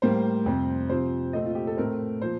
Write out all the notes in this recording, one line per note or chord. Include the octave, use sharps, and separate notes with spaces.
A2 G3 A#3 C5
F2 C3 G3 C4
C3 F3 C4 C5
A#2 A3 C4 D#5
F4
G4
A4
A2 A3 C4 A#4
A#2 F3 C5